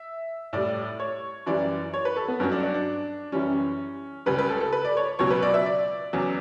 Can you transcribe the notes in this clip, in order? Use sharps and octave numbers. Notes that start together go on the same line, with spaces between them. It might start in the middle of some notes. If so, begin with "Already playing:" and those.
Already playing: E5
A2 G3 D5
C#5
F#2 E3 G3 D5
C#5
B4
A4
B3
G2 F#3 C#4
D4
D4
D4
F#2 E3 G3 C#4
C#2 C#3 G3 B4
B4
A4
A4
B4
D5
C#5
C#2 B2 F#3 C#5
B4
D5
E5
D5
E2 C#3 F#3